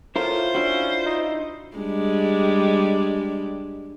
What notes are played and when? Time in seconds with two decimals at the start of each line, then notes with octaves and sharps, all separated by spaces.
0.16 A2 E4 F4 A#4 C5
0.55 C#4 D4 E4 F#4
1.06 D#4
1.76 G3 G#3 D4